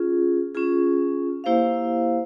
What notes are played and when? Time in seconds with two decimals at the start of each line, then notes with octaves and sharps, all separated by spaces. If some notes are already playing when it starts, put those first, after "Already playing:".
Already playing: C#4 F4 G#4
0.55 C#4 F4 G#4
1.44 A#3 E4 G4 C5 F5